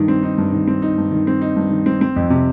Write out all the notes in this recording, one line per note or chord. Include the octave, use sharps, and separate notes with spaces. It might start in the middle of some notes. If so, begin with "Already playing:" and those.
Already playing: G2 D#3 D#4
C4
D#4
G2
D#3
C4
D#4
G2
D#3
C4
D#4
G2
D#3
C4
C4
F2
C3